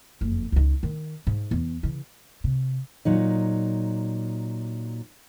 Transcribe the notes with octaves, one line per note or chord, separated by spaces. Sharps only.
F#1 F2
C#2 D#4
D#3
G#2
E2
C#3 E3
C3
A#2 F#3 D#4